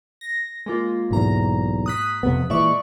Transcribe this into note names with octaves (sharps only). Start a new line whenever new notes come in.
A#6
G#3 A#3 F4
B1 E2 G#2 A#5
D#6 F#6 B6
F2 C3 B3
A#2 E3 G#3 D5 E5 C#6